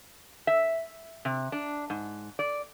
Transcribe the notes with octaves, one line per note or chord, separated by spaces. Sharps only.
E5
C3
D4
G#2
D5